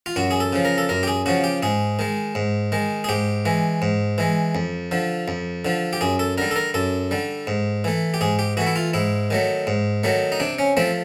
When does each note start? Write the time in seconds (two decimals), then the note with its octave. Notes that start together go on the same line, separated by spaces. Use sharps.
0.06 F4
0.16 F#2 F#4
0.31 G#4
0.40 A4
0.53 C#3 F3
0.65 A#4
0.78 A4
0.89 F#2 A#4
1.03 G4
1.07 G#4
1.26 C#3 F3 F#4
1.44 G4
1.63 G#2 G#4
1.99 D#3 G#3
2.35 G#2
2.72 D#3 G#3
3.04 G#4
3.09 G#2 G4
3.45 E3 G#3
3.82 G#2
4.18 E3 G#3
4.55 F2
4.91 D3 F3
5.28 F2
5.65 D3 F3
5.93 G4
6.01 F#2 G#4
6.19 A4
6.38 D3 G3 A#4
6.51 A4
6.56 A#4
6.74 F#2 A4
7.11 D3 G3
7.47 G#2
7.84 E3 A3
8.14 G4
8.21 G#2 G#4
8.39 G4
8.57 E3 A3 F#4
8.67 E4
8.76 F4
8.94 G#2 E4
9.30 D#3 F#3 A3
9.67 G#2
10.04 D#3 F#3 A3
10.32 D#4
10.40 C3 D4
10.59 C#4
10.77 F3 A3 C4